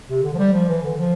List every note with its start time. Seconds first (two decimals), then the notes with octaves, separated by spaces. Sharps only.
0.09 C3
0.23 D3
0.34 F3
0.38 G3
0.53 F3
0.68 E3
0.83 D3
0.97 F3